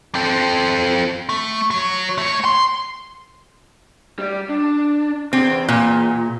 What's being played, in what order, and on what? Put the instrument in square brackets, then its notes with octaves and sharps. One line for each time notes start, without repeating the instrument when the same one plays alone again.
[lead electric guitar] C4 A4
A3
F#3
A3 C#5
C6
G3 D5
D4
[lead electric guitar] E2 [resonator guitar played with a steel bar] C4
[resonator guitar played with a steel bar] A#2